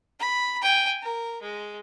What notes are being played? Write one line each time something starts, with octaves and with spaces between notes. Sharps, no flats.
B5
G5 G#5
A#4
G#3